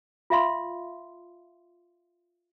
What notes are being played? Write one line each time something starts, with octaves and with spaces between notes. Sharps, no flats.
F4 E5 F5 C6